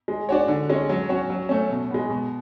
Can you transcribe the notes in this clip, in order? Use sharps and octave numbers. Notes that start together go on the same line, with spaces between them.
G#3
D4 F#4 C#5
D3
G#3 C#4
F#3
C#4 F#4 C#5
F#3
A3 C#4
B2
G#3 B3
B2